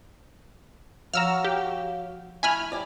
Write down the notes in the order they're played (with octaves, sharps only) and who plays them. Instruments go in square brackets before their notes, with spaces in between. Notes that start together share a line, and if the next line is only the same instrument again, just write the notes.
[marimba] F3 [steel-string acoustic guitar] F#4 C#5 F5 [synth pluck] A#5 E6 F6
[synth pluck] G4
[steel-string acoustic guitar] A3 E4 [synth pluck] G#5 B5 F6
[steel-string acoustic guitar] G3 E4 D5